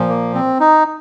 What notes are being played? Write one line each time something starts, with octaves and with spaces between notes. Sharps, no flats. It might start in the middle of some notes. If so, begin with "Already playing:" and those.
Already playing: A#2 F3
A#3
C4
D#4